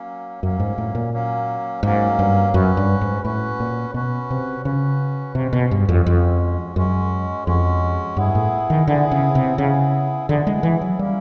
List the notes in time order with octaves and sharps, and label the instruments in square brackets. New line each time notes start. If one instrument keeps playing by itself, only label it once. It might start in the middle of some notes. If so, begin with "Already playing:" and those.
Already playing: [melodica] F#3 A#3 C#4
[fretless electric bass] F#2 [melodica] F#3 A#3 C#4
[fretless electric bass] G#2
A2
A#2
[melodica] F#3 A#3 C#4
[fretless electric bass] G#2 [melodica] F#3 A#3 C#4
[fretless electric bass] G2
[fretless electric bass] F#2 [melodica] C#4 F#4 B4
[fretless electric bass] G2
G#2
[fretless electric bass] A2 [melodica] C#4 F#4 B4
[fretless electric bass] A#2
[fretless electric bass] B2 [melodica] C#4 F#4 B4
[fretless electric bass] C3
[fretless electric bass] C#3 [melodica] C#4 F#4 B4
[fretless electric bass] C3 [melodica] G#3 C#4 F#4
[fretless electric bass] B2
G2
F2
[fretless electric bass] F2 [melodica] G#3 C#4 F#4
[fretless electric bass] F#2 [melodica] G#3 C#4 F#4
[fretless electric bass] F2 [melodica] G#3 C#4 F#4
[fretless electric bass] G2 [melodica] B3 E4 G#4
[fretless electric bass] A2
D#3
[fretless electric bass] D3 [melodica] B3 E4 G#4
[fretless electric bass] C#3
C3
[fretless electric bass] C#3 [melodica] B3 E4 G#4
[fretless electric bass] D3 [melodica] B3 E4 G#4
[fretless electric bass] G#3
E3
F#3
[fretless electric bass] G3 [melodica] A#3 C#4 E4